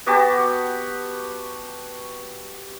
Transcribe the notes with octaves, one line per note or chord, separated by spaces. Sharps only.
B3 F#4 G4 A5